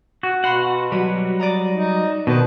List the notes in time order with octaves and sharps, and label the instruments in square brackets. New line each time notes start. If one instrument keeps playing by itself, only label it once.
[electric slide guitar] F#4
[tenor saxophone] B2 [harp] F5 B5 C6 [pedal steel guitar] F#5
[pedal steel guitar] F#3 G3 [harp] B4
[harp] D5 D#5 A#5
[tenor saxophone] D#4
[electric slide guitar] B2 [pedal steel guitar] D#3 [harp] C4 [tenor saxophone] B4